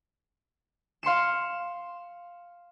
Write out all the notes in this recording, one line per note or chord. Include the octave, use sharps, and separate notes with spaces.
F5 C6 C#7 E7